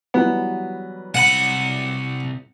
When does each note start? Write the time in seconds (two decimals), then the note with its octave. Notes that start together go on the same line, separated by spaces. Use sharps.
0.14 E3 F#3 G3 B3
1.14 C2 F#5 B5